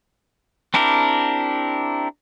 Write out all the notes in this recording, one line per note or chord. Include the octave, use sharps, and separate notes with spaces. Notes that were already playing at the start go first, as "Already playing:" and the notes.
C4 D4 E4 G4 A#4